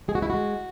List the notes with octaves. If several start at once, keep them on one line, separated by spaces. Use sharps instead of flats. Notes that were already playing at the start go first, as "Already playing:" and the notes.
G#3 G#4
F#4
E4
G#3 F#4